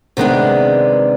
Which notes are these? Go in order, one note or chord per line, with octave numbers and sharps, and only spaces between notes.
C3 D#3 G#3 B3 D4